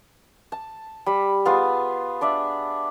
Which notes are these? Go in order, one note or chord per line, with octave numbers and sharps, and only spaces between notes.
A5
G3 B5
B3 F4 G#4 G#5
D4 D5 E5